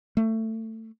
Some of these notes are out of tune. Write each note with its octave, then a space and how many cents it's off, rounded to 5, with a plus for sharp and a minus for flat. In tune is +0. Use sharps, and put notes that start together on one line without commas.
A3 +20